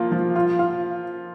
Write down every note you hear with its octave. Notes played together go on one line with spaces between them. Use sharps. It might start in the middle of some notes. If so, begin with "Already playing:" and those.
Already playing: F3 A#3 F4
F3
F4
F4